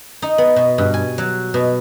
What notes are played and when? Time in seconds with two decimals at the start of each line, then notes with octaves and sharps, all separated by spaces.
0.22 D#4
0.38 B3
0.56 B2
0.78 G2
0.94 G#5
1.18 F#3
1.54 B2